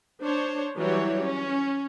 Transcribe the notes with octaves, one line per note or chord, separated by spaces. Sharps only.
D4 C5 C#5
E3 F#3 G3 E4 G4 C#5
C#4